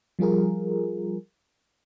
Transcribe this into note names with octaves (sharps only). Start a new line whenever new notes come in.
F3 G3 F4 G#4 A#4